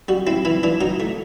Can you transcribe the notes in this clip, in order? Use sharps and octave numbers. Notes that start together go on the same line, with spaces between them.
G3 F#4
C4 E4
E3 E4
E3 D4
F#3 D#4
A3